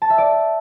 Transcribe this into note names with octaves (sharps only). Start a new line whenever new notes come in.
A5
E5
D5